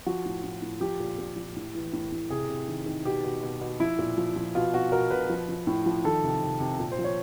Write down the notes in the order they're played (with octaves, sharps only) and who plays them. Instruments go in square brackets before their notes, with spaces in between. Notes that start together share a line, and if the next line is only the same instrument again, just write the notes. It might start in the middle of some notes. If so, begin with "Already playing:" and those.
[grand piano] F3 F#4
A2
A2
A2
F3 G4
A#2
A#2
F3
A2
E3
A2
A2
C3 G#4
C3
D#3
D#3
B2 G4
B2
B2
B2
F3 E4
A#2
F3
F3
B2 F4
B2 F#4
B2 A#4
B2 B4
F3
F3
A2
F3
D#3 A4
C3
C3
C3
A#2
C5
F3
C#5